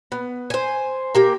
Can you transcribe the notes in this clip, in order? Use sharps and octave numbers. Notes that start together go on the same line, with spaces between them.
B3
C5 G#5
A#3 G4 A#4